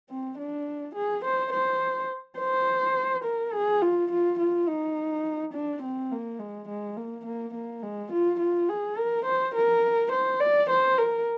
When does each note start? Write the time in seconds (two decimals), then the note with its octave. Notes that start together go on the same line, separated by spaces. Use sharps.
0.10 C4
0.38 D4
0.95 G#4
1.25 C5
1.53 C5
2.39 C5
3.24 A#4
3.53 G#4
3.82 F4
4.11 F4
4.39 F4
4.68 D#4
5.53 D4
5.83 C4
6.12 A#3
6.39 G#3
6.68 G#3
6.97 A#3
7.26 A#3
7.54 A#3
7.83 G#3
8.12 F4
8.40 F4
8.69 G#4
8.98 A#4
9.25 C5
9.55 A#4
10.12 C5
10.40 D5
10.70 C5
10.98 A#4